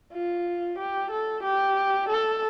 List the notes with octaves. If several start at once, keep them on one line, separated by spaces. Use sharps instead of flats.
F4
G4
A4
G4
A4